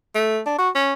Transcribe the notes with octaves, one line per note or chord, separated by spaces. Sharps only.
A3
D4
F#4
C#4